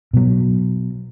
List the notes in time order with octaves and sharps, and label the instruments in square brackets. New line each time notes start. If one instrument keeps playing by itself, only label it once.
[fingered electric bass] B2 F#3